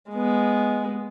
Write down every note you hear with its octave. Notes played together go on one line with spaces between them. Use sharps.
G#3 B3